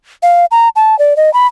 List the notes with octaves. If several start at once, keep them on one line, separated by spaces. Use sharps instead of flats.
F5
A#5
A5
D5
D#5
B5